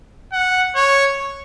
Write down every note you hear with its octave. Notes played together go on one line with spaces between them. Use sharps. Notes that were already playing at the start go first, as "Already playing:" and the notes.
F#5
C#5